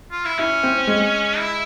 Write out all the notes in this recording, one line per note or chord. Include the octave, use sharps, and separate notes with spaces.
F4
E4
C#4 E4
C4
G#3
E4